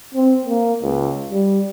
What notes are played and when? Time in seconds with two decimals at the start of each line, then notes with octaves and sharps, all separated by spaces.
0.14 C4
0.45 A#3
0.83 C#2
1.31 G3